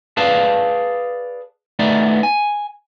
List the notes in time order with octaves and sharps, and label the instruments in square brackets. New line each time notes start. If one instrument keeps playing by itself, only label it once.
[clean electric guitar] G#4 B4 D5 F5 A5
A3 B3 D#4 D5
G#5